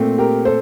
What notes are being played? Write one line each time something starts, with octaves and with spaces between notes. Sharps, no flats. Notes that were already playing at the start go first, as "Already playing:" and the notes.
Already playing: A#2 A3 C4
G4 A#4
A4 C5